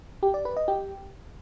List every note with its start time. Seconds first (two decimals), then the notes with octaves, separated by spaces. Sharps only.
0.23 G4
0.34 D5
0.45 B4
0.57 D#5
0.68 G4